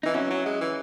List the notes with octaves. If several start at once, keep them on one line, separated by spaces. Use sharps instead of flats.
E3 D#4
F#3 C#4 E4
F#3
G#3
E3